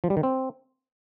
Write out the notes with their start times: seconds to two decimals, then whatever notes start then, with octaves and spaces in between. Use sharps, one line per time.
0.04 F3
0.10 G3
0.17 D#3
0.23 C4